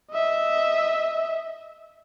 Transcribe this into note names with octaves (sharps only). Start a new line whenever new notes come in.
D#5 E5